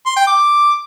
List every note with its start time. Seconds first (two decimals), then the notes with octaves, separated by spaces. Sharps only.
0.06 C6
0.16 G5
0.27 D6